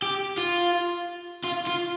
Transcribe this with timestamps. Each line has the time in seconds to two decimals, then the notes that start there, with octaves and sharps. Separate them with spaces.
0.02 G4
0.38 F4
1.44 F4
1.67 F4